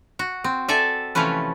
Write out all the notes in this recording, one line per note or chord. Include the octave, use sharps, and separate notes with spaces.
F#4
C4
A4 D5 E5 G#5
C3 E3 F3 A3 C#4 B4